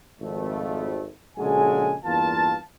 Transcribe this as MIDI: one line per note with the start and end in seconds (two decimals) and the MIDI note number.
0.21 1.07 32
0.21 1.07 41
0.21 1.07 57
1.38 1.94 34
1.38 1.94 49
1.38 1.94 56
1.38 1.94 66
1.38 1.94 69
1.38 1.94 80
2.04 2.54 40
2.04 2.54 43
2.04 2.54 58
2.04 2.54 65
2.04 2.54 77
2.04 2.54 81